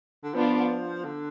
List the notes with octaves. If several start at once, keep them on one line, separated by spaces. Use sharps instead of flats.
D3
F3 B3 D4 F4
D3